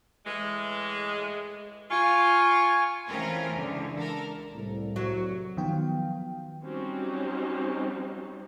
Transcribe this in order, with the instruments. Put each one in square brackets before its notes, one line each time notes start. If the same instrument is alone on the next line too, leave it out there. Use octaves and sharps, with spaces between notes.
[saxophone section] A2 E3 G#3
[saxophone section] F4 [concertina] G#5 C#6
[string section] E3 A3 C4 C#4 F4 A#4
C#2 D3 E3
A4 A#4
[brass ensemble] C2 A2
[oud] F#3
[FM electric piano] D#3 F3 F#3 B3 F5 G5
[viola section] F#3 G3 C4 C#4 D#4